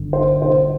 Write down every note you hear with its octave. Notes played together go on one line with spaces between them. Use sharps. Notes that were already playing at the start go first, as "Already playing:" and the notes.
Already playing: G1 D3
C5
C5